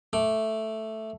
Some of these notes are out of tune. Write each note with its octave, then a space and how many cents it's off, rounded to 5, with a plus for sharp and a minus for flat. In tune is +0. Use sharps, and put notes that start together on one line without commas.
A3 +0 D6 +0